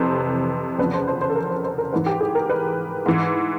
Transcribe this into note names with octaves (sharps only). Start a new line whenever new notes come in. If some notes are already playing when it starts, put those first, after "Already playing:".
Already playing: F2 C3 E3 B4 C5
E2 C#3 F3 B4
C5
C5
C5
A4
A#4
C5
C5
A#4
G#2 E3 B4
G4
G#4
A#4
B4
G#2 E3